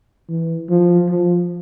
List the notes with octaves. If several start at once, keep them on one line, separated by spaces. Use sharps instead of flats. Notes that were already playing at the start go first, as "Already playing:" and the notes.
E3
F3
F3